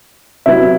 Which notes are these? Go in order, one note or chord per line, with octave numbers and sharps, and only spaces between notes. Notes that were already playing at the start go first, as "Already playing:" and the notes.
C3 F#3 B3 E4